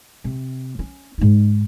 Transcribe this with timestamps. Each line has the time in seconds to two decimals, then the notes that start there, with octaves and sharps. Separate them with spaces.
0.24 C3
0.79 C#4
1.18 G#2 D#4